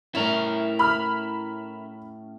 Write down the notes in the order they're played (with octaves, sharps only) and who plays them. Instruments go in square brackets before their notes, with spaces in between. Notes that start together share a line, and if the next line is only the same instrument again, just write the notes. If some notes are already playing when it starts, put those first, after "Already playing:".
[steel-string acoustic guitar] A2 C#4 [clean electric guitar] E4 A#4
[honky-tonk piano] B5 F6